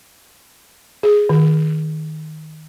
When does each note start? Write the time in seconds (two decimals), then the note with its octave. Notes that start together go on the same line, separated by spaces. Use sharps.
1.03 G#4
1.29 D#3